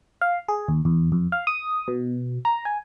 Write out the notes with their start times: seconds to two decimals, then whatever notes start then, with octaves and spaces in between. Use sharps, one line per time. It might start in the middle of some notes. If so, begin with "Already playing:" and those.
0.21 F5
0.48 G#4
0.68 D#2
0.85 E2
1.12 F2
1.32 F5
1.47 D#6
1.88 B2
2.45 A#5
2.65 G#5